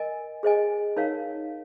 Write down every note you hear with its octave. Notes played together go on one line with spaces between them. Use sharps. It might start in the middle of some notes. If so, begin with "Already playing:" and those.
Already playing: A#4 D#5 G#5
G#4 C5 D#5 G#5
D#4 A#4 C#5 F5